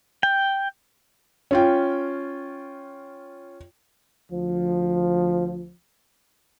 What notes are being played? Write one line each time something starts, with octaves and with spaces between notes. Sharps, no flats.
G5
C#4 F4 G5
D2 F3